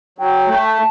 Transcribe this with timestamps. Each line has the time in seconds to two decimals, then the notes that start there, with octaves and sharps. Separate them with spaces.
0.18 F#3 G5
0.47 A3
0.62 A5